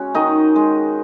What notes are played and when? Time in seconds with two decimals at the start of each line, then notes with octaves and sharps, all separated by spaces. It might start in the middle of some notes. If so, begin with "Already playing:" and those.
Already playing: G#3 C#4 F#4 G#4
0.15 D#3 D#4 D#5
0.56 G#3